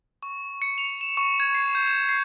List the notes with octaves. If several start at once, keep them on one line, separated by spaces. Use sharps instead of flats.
C#6
C#7
F7
E7
C#6
G#6
C7
G6
E7
C7